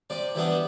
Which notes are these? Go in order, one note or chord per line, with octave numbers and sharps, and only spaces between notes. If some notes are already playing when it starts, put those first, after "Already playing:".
C3 D5
E3 G3 B3 D4